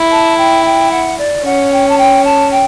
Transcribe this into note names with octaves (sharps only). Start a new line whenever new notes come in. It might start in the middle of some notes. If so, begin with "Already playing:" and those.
Already playing: E4
A5
G5
G5
F#5
D5
C#4 F#5
G5
A5
G5
A5
G5